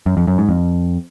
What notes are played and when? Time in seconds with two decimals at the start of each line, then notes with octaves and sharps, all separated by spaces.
0.06 F#2
0.17 F2
0.27 F#2
0.38 G#2
0.49 F2